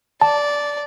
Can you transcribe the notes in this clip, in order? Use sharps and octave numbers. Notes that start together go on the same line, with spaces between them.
D5 A5